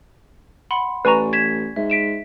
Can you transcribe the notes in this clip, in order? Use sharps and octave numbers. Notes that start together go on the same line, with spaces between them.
F#5 B5 C6
A1 B4 D5 G#5 A#5 C#6
G#6 B6 E7
G#2 E5
B6 D7 E7